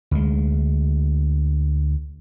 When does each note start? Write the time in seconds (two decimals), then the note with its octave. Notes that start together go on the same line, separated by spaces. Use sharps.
0.11 D2 G#3